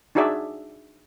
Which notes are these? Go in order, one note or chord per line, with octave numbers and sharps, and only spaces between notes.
D4 D#4 F#4 G#4 D5 E5